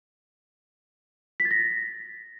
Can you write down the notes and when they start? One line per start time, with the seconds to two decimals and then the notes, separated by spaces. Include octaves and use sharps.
1.40 B6
1.45 A6
1.51 A#6